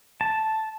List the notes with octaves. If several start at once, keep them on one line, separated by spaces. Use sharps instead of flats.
A5